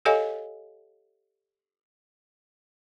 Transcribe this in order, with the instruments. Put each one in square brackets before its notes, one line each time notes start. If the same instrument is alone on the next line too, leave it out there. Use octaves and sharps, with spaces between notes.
[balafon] G4 A4 C#5 D#5 F5 G#5